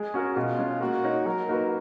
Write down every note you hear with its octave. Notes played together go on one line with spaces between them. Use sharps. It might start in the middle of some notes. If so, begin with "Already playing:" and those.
Already playing: G#3 G#4
C#4 F#4 A#4
B2 F4
G#3 C#4
A#3 F#4
D#4 A#4 C#5
F#3 A#4
A#3 D#4 F#4 B4